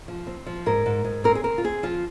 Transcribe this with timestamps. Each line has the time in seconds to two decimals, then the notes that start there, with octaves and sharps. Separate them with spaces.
0.08 F3
0.27 C4
0.46 F3
0.66 G#2 A#4
0.86 G#2
1.05 G#2
1.24 C4 A#4
1.35 G#4
1.44 C4 A#4
1.58 F4
1.64 C4 G#4
1.83 F3 F4